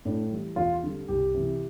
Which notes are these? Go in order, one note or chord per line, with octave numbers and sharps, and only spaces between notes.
A2 D4
E3 G3
E2 F4
D3 G3
C2 G4
C3 E3